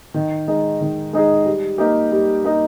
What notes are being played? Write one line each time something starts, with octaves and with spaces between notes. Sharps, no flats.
D#3
G#3 D#4 G#4
D#3
G#3 D#4 G#4
G3
A#3 D#4 G4
G3
A#3 D#4 G4